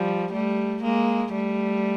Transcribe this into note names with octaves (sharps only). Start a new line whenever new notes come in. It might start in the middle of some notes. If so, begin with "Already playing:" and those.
Already playing: F3 G3
G3 A3
G#3 A#3
G3 A3